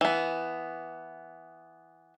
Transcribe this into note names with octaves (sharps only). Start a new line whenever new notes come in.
E3 B3